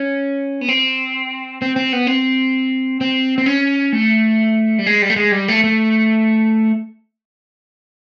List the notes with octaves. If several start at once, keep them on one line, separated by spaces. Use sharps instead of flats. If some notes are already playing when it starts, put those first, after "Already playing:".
Already playing: C#4
B3
C4
C4
C4
B3
C4
C4
C4
C#4
A3
G3
G#3
G3
A3
G#3
G3
A3
A3